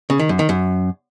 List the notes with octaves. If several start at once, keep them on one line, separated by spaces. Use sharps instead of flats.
C#3
D#3
F#2
D#3
F#2